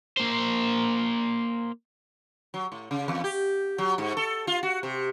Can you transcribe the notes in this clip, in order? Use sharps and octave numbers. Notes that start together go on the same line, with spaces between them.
A#3 C5
F#3
A2
C#3
E2
G4
F#3
G#2
A4
F4
F#4
C3